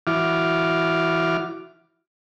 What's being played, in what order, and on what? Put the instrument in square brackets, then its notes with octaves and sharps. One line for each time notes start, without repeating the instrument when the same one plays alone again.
[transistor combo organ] E3 E4 F#4 D6 F6